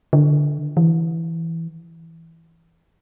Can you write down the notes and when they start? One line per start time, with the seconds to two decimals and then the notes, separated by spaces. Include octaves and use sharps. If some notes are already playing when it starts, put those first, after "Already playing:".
0.13 D3
0.77 E3